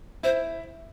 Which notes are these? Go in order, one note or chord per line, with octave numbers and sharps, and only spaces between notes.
E4 C5